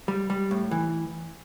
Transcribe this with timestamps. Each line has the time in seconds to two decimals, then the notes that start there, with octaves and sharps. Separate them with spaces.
0.08 G3
0.30 G3
0.51 A2
0.71 E3